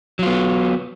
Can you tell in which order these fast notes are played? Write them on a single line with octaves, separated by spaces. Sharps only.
F#3 F4 B3